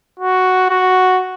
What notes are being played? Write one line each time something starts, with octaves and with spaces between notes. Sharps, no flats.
F#4
F#4